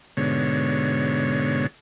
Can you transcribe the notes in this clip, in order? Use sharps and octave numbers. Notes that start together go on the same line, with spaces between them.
G#2 B2 D3 C#5